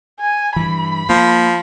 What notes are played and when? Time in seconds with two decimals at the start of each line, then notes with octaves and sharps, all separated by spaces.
0.20 G#5
0.56 G2 E3 B5
1.09 F3 A#3